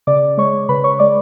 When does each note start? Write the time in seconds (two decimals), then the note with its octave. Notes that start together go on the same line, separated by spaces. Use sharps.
0.07 C#3 D5 D6
0.37 G#3 C#5 C#6
0.69 C#3 B4 B5
0.84 C#5 C#6
0.99 G#3 D5 D6